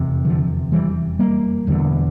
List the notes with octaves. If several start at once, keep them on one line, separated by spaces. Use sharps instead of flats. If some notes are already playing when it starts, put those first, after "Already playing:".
Already playing: F1 E2 C3
D3 F3
E3 G3
G3 A#3
E1 E2 D3